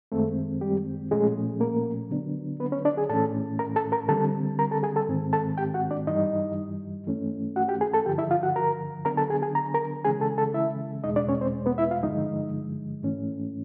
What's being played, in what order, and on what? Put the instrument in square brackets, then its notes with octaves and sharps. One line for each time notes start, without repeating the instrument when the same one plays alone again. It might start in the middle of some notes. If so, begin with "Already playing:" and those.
[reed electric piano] F#2 D#3 G#3 A3 C4 A4
G3 G4
A#2 F3 G#3 A3 C#4 G#4
A#3 A#4
D3 F#3 B3 D4
B3 B4
C#4 C#5
D4 D5
G#4 G#5
A2 E3 A3 C#4 A4 A5
A#4 A#5
A4 A5
A#4 A#5
D3 G3 C4 A4 A5
A#4 A#5
A4 A5
G#4 G#5
A4 A5
G#2 D#3 G#3 C4
A4 A5
G4 G5
F#4 F#5
D4 D5
G2 E3 G3 D#4 D#5
G2 E3 A3 C#4
F#4 F#5
G4 G5
G#4 G#5
A4 A5
G2 D3 F3 G4 G5
E4 E5
F4 F5
F#4 F#5
A#4 A#5
D3 F#3 B3 D4 A#4 A#5
A4 A5
G#4 G#5
G#4 G#5
A#5
A#4 A#5
C#3 E3 G#3 C#4 G#4 G#5
A4 A5
A4 A5
E4 E5
E2 B2 G#3 D#4 D#5
D4 D5
C#4 C#5
C4 C5
B3 B4
E4 E5
F4 F5
G2 D3 F3 G#3 D#4 D#5
G#2 E3 A3 C#4